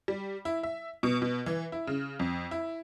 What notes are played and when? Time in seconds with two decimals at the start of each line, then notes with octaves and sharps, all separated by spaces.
0.08 G3
0.45 E4
0.63 E5
1.03 B2
1.22 B2
1.46 E3
1.72 E4
1.87 C#3
2.19 F2
2.51 E4